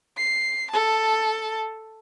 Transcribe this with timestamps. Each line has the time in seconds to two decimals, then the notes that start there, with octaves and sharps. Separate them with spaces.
0.17 C7
0.71 A4 A5